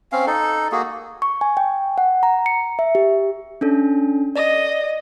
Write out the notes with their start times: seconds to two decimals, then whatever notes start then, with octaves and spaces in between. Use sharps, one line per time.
0.12 C4 C#4 F5
0.27 D#4 A4
0.72 A#3 F#4 G#4
1.22 C#6
1.41 G#5
1.57 G5
1.98 F#5
2.23 A#5
2.46 C#7
2.79 E5
2.95 G4
3.61 C#4 D4 A4
4.36 D5 D#5